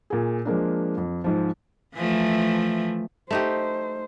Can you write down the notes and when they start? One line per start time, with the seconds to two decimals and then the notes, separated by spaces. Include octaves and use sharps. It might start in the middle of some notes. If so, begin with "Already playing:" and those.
0.10 A#2 G#4
0.45 F3 G#3 A#3 D4
0.97 F2
1.24 G#2 F3
1.95 E3 F3 A3
3.31 A3 D#4 G4 C5